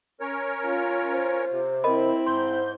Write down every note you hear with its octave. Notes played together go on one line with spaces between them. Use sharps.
C#4 A#4 C#5
F4
C5
C3
C4 E4 A#4 D#5 B5
G#2 C5 C6 G6